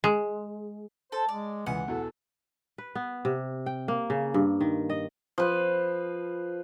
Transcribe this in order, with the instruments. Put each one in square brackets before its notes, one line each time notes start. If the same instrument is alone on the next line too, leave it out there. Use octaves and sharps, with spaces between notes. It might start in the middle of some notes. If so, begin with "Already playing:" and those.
[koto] G#3
[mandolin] A4 [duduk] C5
[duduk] G#3 [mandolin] D5
[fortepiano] C#2 G#5 [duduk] E3 [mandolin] F#5
[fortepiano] E2 B2 E3 [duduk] A4
[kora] B4
B3
C3
G5
A#3
C#3
G2
D#3
D#5
[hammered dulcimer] F3 B4